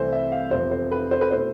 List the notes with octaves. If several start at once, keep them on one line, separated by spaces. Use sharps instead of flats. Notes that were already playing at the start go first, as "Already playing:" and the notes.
Already playing: C2 C3 E3 A3 C4 C5
E5
F5
F1 E2 C3 F3 C5
C5
B4
C5
B4
B2 A3 E4 C5